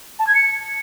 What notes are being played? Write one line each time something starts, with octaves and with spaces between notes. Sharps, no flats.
A5
G#6
C#7